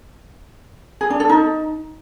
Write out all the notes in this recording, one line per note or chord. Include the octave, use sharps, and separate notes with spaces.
G#4
D4
A4
D#4